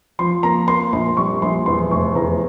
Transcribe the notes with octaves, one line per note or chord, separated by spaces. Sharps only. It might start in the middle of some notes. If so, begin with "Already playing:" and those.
F3 C6
A#3 A#5
A#3 C6
A#1 C6
G3 C#6
A#1 C6
E2 C6
F1 C#6
E2 A#5